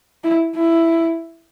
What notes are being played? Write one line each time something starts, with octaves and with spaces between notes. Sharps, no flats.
E4
E4